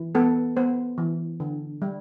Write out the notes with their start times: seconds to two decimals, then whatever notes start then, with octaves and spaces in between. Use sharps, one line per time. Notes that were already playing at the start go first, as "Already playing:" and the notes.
Already playing: E3
0.15 B3 A4
0.57 B3 C5
0.98 E3
1.40 D3
1.82 G3